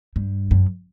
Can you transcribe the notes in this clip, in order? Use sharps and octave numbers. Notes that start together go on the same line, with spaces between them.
G2
F#2